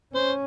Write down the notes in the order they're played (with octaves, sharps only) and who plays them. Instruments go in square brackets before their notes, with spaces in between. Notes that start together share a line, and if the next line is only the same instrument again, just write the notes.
[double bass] C#4 [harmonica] C5